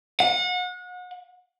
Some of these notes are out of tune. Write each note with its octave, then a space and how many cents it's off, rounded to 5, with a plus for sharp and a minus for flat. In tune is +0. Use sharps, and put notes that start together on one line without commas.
F#5 -35